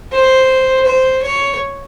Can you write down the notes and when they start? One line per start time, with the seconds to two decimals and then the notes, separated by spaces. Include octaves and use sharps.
0.12 C5
0.85 C5
1.22 C#5